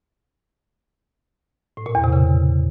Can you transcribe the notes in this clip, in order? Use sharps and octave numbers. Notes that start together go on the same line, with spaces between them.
A2
A#2
E2
C3
C#3